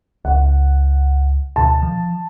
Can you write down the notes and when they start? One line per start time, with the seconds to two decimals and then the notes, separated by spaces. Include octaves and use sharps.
0.25 C#2 F#5
1.56 D2 B2 D3 A5
1.82 F3